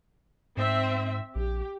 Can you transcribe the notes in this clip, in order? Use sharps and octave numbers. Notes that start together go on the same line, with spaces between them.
G#2 C4 E5
A#1 G4